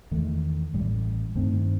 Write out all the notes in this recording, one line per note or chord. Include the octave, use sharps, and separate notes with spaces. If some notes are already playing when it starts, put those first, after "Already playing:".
E2 D#3 A3
A1 A2 G3
G2 D#3 A3 C4